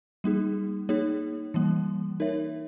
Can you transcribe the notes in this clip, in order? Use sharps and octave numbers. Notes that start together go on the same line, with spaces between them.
G3 A#3 D#4 G#4
A#3 D#4 G#4 C#5
E3 G3 A#3
D#4 A#4 C#5 E5